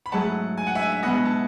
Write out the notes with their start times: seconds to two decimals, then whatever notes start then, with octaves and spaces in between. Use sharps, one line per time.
0.06 B5
0.12 G#2 F#3 A3 E4 G#4 F#5 A5
0.58 G#5
0.67 F#5
0.75 E5 G#5
0.92 E5
1.02 B2 G#3 B3 E4 D#5 F#5
1.25 A5